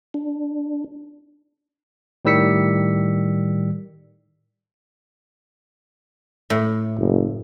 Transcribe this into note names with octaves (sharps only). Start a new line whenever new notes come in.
D4
A2 D#3 G3 E6 B6 C#7
A2
F#1